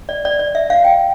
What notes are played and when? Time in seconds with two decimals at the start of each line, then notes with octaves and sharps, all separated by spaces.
0.09 D5
0.25 D5
0.39 D5
0.55 E5
0.70 F5
0.85 G5